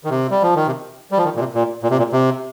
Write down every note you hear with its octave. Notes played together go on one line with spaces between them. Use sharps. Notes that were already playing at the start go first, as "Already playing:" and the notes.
D#3
C3
G3
F3
D#3
C3
G3
F3
D#3
A#2
C3
A#2
A#2
C3
A#2
C3